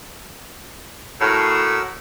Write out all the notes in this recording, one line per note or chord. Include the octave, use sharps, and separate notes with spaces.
A2 F#4 A#4 E6